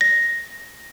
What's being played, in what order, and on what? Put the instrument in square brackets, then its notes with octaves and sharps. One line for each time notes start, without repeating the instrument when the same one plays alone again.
[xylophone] A#6